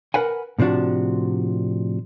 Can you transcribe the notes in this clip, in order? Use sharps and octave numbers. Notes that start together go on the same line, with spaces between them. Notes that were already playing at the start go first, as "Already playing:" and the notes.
A#4 B4 F#5 G#5
A2 C3 F3 D4 F#4